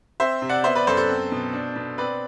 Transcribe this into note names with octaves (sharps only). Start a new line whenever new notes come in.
C4 C5 E5
C3
D5 F#5
B3 C5 E5
B4 D5
F#2 A4 C5
A4 C5
C4
B2
D4
B2
C4 B4 D5